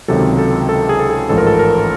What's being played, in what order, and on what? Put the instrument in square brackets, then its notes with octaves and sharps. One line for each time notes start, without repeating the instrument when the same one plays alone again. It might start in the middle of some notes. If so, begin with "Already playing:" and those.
[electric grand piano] C#2 C3 D#3 F#3 A4
A4
A4
G#4
A4
G#4
A1 G#2 F3 A4
A#4
A4
A#4